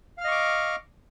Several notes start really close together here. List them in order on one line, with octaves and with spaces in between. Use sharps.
F5 F6 D#5 C#6 D6